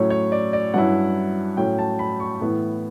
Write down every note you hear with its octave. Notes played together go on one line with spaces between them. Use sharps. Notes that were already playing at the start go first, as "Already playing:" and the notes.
Already playing: A2 F#3 C#4 C#5
C#5
D5
D5
G2 F#3 C#4 E4 F#5
A2 F#3 C#4 G5
A5
B5
C#6
A2 E3 B3 E4